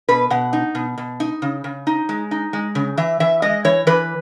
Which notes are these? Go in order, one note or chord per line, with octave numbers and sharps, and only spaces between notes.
B2 B4
B2 F#5
D#4
B2
B2
D#4
C#3
C#3
D#4
G#3
D#4
G#3
C#3
E3 E5
E3 E5
G#3 D#5
E3 C#5
E3 B4